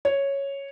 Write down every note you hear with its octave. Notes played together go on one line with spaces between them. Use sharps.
C#5